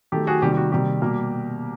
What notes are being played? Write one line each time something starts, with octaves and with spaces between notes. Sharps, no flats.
D#3 F#3 A3 G4 A4
F#4 G#4
C3 D#3 G3 A#3 G4
G4
F#4
C3 D#3 G3 A#3 G4
B2 G3 A#3